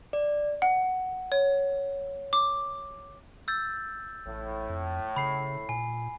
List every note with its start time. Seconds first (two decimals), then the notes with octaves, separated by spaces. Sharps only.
0.13 D5
0.62 F#5
1.32 C#5
2.33 D6
3.48 E6 G6 A6
4.26 A1 A2
4.70 F2
5.16 C#3 B5 C7
5.69 A#2 G#5